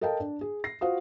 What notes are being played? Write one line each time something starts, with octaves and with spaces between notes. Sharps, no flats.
A4 A#4 D#5 F5 G5 A5
D4
G#4
A#6 C7
F4 F#4 C5 F5 F#5 D#6